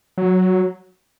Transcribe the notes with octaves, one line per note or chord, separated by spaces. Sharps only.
F#3